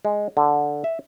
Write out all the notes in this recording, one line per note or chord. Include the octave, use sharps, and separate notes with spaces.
G#3
D3
E5